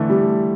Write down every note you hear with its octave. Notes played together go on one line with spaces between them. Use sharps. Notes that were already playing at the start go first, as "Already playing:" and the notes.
Already playing: D3 E3 A3
G3